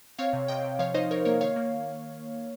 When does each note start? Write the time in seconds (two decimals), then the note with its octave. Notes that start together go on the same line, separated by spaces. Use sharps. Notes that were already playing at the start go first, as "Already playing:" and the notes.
0.18 C4 C#5 F5
0.33 C3
0.48 C3 D#5 G5
0.64 C3
0.79 F3 C#5 F5
0.94 D#4 C5 D#5
1.11 D#4 A#4 C#5
1.25 A#3 A#4 C#5
1.41 D#3 C#5 F5
1.56 A#3